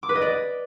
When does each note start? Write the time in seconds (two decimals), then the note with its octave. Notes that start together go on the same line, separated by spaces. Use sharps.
0.03 D6
0.09 B4
0.15 D#5
0.22 D5